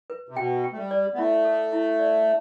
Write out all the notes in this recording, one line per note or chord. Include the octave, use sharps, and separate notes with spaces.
B4
C3
B2 G5
G5
A3
G3
D5
B3
A3 E4
A4
E4
D5